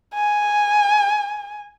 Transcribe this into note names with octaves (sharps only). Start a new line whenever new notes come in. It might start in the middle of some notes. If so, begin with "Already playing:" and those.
G#5